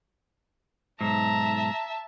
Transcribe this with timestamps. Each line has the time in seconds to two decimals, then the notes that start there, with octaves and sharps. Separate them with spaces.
1.01 B1 G#2 E5 A5 A#5